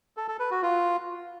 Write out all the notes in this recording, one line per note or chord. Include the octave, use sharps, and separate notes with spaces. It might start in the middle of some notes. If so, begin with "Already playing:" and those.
A4
A4
B4
F#4
F4